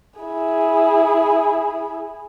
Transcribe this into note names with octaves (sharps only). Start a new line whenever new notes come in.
E4 G#4